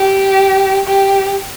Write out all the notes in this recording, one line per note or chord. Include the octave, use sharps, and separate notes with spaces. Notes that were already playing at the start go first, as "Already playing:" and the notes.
Already playing: G4
G4